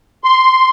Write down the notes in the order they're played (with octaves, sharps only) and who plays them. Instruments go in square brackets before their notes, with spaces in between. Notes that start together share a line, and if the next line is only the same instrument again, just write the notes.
[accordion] C6